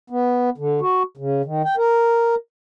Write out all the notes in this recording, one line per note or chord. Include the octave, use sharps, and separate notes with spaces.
B3
D3
F#4
C#3
D#3
G5
A#4